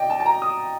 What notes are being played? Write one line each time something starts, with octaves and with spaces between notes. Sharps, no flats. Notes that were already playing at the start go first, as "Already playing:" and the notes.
Already playing: C3 D5 D#5 G5
A5
A5
A#5
D#6